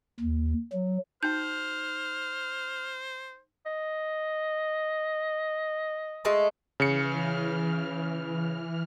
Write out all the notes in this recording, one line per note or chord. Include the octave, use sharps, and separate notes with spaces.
D#2
F#3
D#4 F#4 C5 G5 F6 G6
D#5
G#3 A3 A5
C#3 E3 F6 C#7